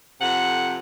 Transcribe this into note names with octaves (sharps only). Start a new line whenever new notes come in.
F2 C3 A4 F#5